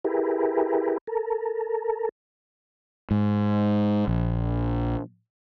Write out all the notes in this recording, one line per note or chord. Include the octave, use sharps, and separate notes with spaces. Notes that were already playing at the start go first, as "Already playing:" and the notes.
E4 G4 G#4 A#4 B4
A4 A#4
G#2
A#1